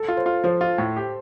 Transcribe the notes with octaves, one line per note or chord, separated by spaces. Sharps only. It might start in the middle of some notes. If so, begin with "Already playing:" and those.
Already playing: A4
F4
C5
F4
F3 C5
F4
A2
G4